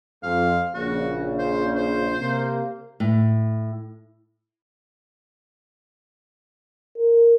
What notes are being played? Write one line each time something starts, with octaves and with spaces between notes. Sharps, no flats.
F2 F5
A#1 C#3 F#4
C5
C5
C3 A#3
A2
A#4